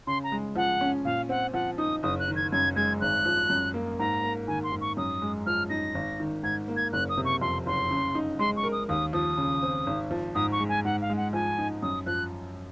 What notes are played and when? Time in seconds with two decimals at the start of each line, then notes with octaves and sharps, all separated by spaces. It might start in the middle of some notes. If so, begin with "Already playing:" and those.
0.07 C#3 C6
0.24 A#5
0.32 G#3
0.56 F3 F#5
0.81 C#4
1.05 A#2 F5
1.29 C4 F#5
1.54 F3 F#5
1.78 D#4 D#6
2.03 F#1 D#6
2.19 F#6
2.28 D#3
2.36 G#6
2.52 F#2 G#6
2.76 G#3 G#6
3.01 G#1 F#6
3.25 F3
3.50 F#2
3.74 A#3
3.99 G#2 A#5
4.23 A#3
4.48 D#3 G#5
4.64 C6
4.72 G#2
4.81 C#6
4.97 F#2 D#6
5.22 G#3
5.46 F3 F6
5.70 D#4 A#6
5.95 G#1
6.20 D#3
6.43 G#2 G#6
6.68 A#3
6.76 G#6
6.93 F#1 F#6
7.09 D#6
7.17 C3
7.25 C#6
7.41 F2 C6
7.66 F#1 C6
7.91 C#3
8.15 D#4
8.39 G#3 C6
8.56 C#6
8.64 A#4
8.72 D#6
8.89 D#2 D#6
9.13 F3 D#6
9.38 C#3
9.63 C4
9.87 G#1
10.11 F3
10.35 G#2 D#6
10.52 C#6
10.59 G#3
10.69 G#5
10.85 G#2 F#5
11.01 F5
11.10 G#3
11.17 F#5
11.33 F3 G#5
11.58 D#4
11.83 F#2 D#6
12.06 F3 F#6